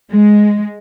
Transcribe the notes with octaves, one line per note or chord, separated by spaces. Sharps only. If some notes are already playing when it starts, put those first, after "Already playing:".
G#3